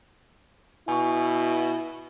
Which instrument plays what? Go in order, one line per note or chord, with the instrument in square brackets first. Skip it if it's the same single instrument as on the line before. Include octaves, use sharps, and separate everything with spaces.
[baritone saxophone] B2 [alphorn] E4 [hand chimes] G#5 C#6